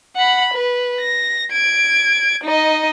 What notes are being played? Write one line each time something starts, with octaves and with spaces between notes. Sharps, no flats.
F#5 B5
B4
A#6
G#6 D7
D#4 D#5